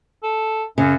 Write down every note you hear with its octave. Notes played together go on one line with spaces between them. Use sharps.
A4
F#2 C#3